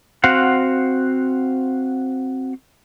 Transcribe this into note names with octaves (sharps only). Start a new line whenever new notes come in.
C4 F#4 C5 F5 F#5